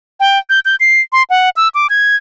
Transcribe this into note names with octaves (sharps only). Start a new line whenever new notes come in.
G5
G6
G6
C7
C6
F#5
E6
D6
G#6